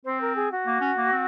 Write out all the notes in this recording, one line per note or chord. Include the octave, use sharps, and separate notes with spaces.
C4 C5
A#4
G#4
F#4
A#3
C#4
A#3
C4